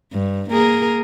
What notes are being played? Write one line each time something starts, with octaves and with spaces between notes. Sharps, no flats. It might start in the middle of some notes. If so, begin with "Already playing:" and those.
G2
A#3 G#4 A#4